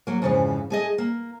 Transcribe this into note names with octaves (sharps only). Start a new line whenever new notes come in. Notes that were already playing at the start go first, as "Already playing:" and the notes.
F#3 A#3
F2 G#2 C#3 E3 F3
A3 G#4 D#5
A#3